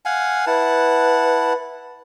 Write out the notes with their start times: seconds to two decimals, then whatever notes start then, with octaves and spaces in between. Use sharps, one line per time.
0.05 F5 F#5 G#5
0.47 E4 B4 F#5 A5